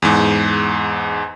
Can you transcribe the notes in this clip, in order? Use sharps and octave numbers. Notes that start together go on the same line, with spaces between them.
E2 G#2